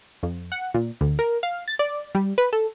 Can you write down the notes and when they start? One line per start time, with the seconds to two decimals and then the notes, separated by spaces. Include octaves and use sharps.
0.23 F2
0.52 F#5
0.74 A#2
1.01 D2
1.19 A#4
1.43 F5
1.68 A6
1.79 D5
2.15 G3
2.38 B4
2.53 A4